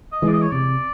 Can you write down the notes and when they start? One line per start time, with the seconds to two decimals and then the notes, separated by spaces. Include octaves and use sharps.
0.13 D#5
0.22 E3 G#3
0.28 D5
0.33 D#5
0.42 C#5
0.52 C3 D5